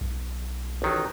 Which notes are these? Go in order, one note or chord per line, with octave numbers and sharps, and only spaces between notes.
B1
A1 D#3 F#3